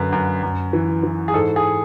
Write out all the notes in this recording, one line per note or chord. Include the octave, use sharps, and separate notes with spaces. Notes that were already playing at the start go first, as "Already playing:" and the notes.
Already playing: F#2 D3 B4
F#2
F#2
E3
E3
G#4
G#2 A4
G#4